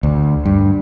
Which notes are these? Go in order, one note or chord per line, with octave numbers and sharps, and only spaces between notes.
D2
G2